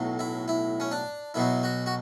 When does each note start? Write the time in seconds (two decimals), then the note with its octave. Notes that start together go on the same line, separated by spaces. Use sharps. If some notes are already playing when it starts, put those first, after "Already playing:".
Already playing: B1 A2 F#3
0.19 E4
0.48 E4
0.80 C#4
0.91 D4
1.34 B1 B2 F#3 E4
1.63 F#4
1.86 F#4